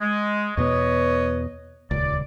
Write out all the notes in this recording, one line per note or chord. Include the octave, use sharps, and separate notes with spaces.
G#3
E2 B2 B3 B4 C#5 D#5
D#1 C#2 D5